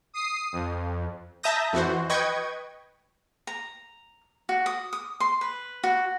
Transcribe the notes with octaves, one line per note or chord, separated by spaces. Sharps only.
D#6 C7
F2
E5 A5 A#5 D#6 G6 A#6
F2 E3 F#4 C5
B4 D#5 G5 C#6 G#6
A#5
F#4
D#6
D#6
C6
B4
F#4